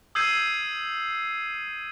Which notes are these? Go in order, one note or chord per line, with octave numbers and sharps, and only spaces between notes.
D#6 E6 G6 G#6 C7 D#7